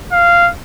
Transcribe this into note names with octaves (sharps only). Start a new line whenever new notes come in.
F5